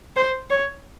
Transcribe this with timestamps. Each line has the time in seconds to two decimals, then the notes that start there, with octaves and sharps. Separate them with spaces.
0.16 C5
0.50 C#5